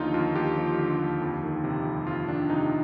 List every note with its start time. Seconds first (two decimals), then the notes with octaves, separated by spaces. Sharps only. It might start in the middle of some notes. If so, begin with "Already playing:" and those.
Already playing: D#2 D3 F3 D#4 F4
0.14 D#2 F4
0.35 D#2 G4
0.57 F3
0.79 D3
1.00 D#2
1.21 F2
1.43 D#3
1.64 C3
1.85 F2
2.07 F2 F4
2.28 D#3 D4
2.50 C3 D#4